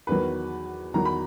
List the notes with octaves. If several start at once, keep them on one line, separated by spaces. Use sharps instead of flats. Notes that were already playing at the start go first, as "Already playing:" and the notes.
E2 D#3 F#3 B4
E2 D#3 F#3 A#5
B5